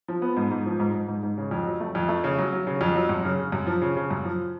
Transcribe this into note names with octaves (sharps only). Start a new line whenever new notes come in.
F3
B3
G#2
G#2
F3
G#2
G#2
G#2
G#2
C#3
F2
F#3
A3
F2
A3
C#3
F#3
F#3
C#3
F2
F#3
F#2
C#3
C#3
F#2
F3
C#3
C#3
F#2
F3